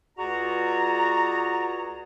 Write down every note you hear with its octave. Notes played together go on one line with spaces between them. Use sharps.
C#2 F#4 G#4 D5 A#5